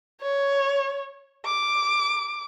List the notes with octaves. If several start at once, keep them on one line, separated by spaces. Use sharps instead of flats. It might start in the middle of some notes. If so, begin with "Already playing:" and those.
C#5
D6